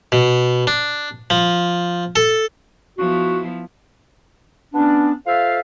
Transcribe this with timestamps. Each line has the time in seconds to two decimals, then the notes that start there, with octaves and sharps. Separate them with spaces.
0.12 B2
0.67 D4
1.30 F3
2.16 A4
2.98 F3 B3 E4 F#4
4.73 B3 C#4 D4
5.26 F4 A4 C5 E5 F5